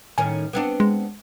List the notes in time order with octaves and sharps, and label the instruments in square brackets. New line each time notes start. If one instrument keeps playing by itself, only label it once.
[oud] A2 D#3 C#4 [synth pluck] G#5
[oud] B3 C4 D4
[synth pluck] G#3